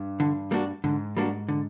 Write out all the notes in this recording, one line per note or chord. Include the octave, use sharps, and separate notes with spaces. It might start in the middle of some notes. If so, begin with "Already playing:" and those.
Already playing: G2
D3
G3 A#3 D4 F#4
G#2 D3
G3 A#3 D4 F#4
D3